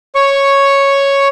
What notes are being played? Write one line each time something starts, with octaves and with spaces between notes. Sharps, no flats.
C#5 C#6